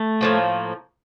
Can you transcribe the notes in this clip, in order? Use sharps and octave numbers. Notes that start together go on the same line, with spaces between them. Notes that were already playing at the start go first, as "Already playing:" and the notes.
Already playing: A3
A2 F3 A#3